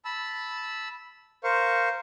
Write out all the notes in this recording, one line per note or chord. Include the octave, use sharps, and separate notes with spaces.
A5 B5 E6
A#4 C5 F5 C#6